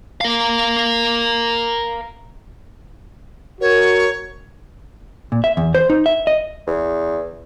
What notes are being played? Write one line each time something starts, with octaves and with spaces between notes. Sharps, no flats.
A#4 F5
F#4 A#4 C#5
A#2
E5
E2
C5
D#4
E5
D#5
E2